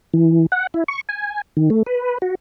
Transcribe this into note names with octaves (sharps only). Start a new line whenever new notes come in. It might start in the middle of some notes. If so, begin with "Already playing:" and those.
E3
F#5
E4
C#6
G#5
D#3
A3
B4
F#4